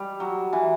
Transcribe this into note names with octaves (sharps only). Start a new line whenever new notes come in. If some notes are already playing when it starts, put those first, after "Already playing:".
Already playing: G3
F#3
E3